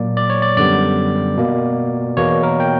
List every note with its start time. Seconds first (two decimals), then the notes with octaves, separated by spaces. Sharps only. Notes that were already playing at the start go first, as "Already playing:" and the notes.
Already playing: A#2 F#3 A#3 D5
0.17 D5
0.30 C#5
0.42 D5
0.57 F#2 D3 G3 B3 D5
1.37 B2 A#3
2.17 E2 B2 A#3 C#5
2.43 A#4
2.60 G5